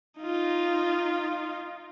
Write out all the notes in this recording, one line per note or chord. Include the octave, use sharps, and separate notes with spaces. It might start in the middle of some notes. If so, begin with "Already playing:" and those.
D#4 F4